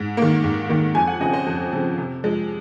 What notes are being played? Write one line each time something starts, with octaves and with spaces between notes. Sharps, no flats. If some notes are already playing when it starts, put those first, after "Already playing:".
Already playing: G#2
D#3 A#3
G#2
D#3 A#3
F2 G#5
F#5
C#3 F3 C4 D#5
C5
F2
C#3 F3 C4
C3
F3 G#3